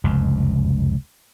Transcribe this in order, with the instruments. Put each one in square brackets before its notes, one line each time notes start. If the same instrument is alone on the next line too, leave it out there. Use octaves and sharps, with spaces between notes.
[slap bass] F1 C#2 F#2